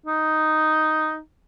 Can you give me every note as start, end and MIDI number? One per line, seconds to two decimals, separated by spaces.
0.06 1.19 63